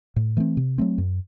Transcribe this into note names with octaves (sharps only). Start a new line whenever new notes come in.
A2
E3 A3 C4
C3
F#3 A3 C4
F#2